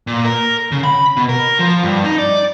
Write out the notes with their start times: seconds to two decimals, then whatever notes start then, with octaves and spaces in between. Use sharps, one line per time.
0.07 A#2
0.25 A#4
0.71 C#3
0.84 B5
1.17 B2
1.29 A#4
1.59 F3
1.83 G2
2.04 D#4
2.18 D5